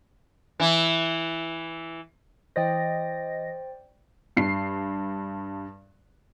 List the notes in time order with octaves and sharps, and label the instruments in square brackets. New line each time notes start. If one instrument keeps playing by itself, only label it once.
[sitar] E3 E4
[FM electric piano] E3 D#5 A#6 [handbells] C5 D5 G5
[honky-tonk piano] G2 C7